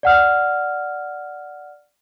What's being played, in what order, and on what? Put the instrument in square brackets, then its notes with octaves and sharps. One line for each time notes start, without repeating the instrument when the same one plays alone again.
[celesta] D5 F#5 F6